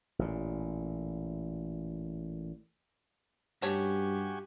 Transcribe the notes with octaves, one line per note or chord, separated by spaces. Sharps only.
A1 A#2
G2 A3 C#4 F#4 G4 C#5 G5 G#5